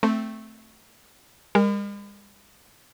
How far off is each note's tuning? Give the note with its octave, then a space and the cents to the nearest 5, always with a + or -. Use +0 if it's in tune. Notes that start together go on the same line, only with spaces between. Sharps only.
A3 +0 C4 +0
G#3 -45 A#4 +0